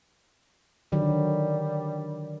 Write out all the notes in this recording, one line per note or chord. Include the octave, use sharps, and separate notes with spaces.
D3 D#3 F#3 G3